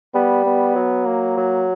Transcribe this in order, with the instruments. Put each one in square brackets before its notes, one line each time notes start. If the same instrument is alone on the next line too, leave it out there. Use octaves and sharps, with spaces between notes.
[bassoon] G3 [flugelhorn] B3
[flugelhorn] B3
[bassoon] F#3
[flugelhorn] A#3
[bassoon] F#3